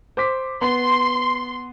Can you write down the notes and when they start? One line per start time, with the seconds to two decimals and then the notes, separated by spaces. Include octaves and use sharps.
0.17 C5 D6 B6
0.61 B3 C6